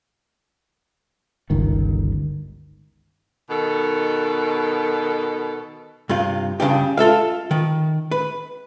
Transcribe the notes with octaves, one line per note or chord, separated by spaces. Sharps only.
G1 C#2 D#3
B2 D#3 A4
G2 C3 F4
G2 C#3 D4 G4
F4 A4 E5 F5
D#3
B4